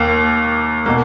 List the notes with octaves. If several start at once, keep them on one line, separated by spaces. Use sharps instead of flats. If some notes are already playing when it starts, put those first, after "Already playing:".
Already playing: D#2 A#3
B2 A#3